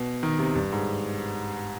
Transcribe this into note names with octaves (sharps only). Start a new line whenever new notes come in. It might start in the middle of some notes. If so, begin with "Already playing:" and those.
Already playing: B2
D#3
C3
G2
G#2